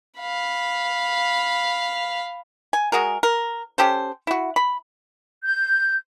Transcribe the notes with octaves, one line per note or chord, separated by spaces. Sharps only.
F5 B5
G#5
G#3 F#4 G#4 A#4
A#4
C#4 G4 A4 C5
E4 F#4
B5
G6